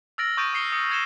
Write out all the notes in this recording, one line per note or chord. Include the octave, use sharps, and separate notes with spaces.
E6 F6 A6 A#6 D7 F#7
C#6 D#6 G6 A6 D7 D#7
C#6 D#6 C7 C#7 G7
D#6 C#7
E6 G#6 A#6 C#7 E7 G7